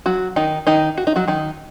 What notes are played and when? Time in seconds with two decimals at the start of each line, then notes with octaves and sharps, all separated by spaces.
0.06 F#3 F#4
0.36 D#3 D#4
0.67 D#3 D#4
0.98 F#4
1.07 D#4
1.16 F#3 F#4
1.28 D#3 D#4